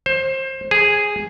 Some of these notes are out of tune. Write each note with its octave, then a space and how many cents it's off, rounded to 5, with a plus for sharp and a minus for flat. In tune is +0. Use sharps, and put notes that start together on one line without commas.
C5 +25
G#4 -5